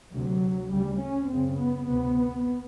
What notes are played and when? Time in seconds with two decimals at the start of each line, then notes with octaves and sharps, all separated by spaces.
0.13 D2 C3 F#3
0.71 D2 C#3 G3
1.01 C#4
1.30 F#2 C#3 C4
1.59 B3
1.89 D2 C3 B3